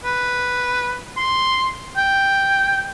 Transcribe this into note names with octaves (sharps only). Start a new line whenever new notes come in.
B4
C6
G5